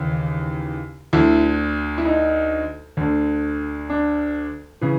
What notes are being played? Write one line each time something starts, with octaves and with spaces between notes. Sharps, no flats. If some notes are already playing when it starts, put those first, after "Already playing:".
Already playing: D#2 C#3 E3
D2 D3 E4
E4
D#4
D2 D3
D4
C#3 E3